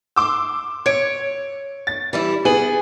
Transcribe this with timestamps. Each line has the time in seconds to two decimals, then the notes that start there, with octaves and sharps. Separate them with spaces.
0.16 C6 D6 E6
0.86 C#5 G#6 D7
1.87 A6
2.13 E3 G3 E4
2.45 B3 G#4 F#7